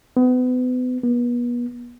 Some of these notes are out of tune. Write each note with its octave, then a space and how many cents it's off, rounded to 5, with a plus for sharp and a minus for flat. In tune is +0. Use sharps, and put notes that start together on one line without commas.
B3 +35
B3 -35